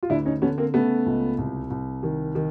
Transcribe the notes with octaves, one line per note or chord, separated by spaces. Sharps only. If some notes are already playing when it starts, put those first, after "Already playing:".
F4
D2 D4 E4
C#4 D#4
D3 B3 C#4
A#3 C4
C#3 A3 B3
C#2
C2
C2
D#3
D#3